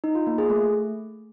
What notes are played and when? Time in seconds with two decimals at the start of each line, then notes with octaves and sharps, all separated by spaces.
0.04 D#4
0.15 F4
0.27 A#3
0.38 G#4
0.50 A3